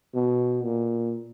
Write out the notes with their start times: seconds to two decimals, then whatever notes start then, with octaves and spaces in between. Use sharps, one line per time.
0.14 B2
0.64 A#2